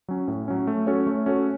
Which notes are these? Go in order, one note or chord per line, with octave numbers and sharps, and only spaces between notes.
F#3 C#4
A2
F#3 C#4
A3
C#4 F#4 A4 C#5
A3
C#4 F#4 A4 C#5